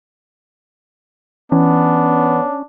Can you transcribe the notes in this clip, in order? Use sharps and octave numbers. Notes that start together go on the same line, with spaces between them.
E3 B3 C#4 D4